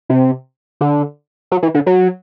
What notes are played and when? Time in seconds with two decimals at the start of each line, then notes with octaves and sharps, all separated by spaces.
0.10 C3
0.81 D3
1.51 F#3
1.63 E3
1.74 D3
1.86 F#3